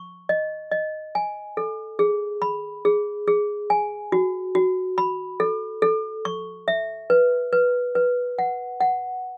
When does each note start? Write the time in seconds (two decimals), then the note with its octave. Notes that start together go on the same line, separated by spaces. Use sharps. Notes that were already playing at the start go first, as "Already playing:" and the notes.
Already playing: C#6
0.29 D#5
0.72 D#5
1.15 G#5
1.57 A4
1.99 G#4
2.42 B5
2.85 G#4
3.27 G#4
3.70 G#5
4.12 F#4
4.55 F#4
4.98 B5
5.40 A4
5.82 A4
6.25 C#6
6.68 E5
7.10 B4
7.53 B4
7.95 B4
8.38 F#5
8.81 F#5